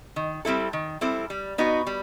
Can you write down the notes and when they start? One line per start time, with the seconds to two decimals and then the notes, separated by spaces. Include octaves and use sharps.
0.16 D#3
0.45 G3 C4 E4 A4
0.73 D#3
1.01 G3 C4 E4 A4
1.30 G3
1.58 B3 D#4 F#4
1.87 G3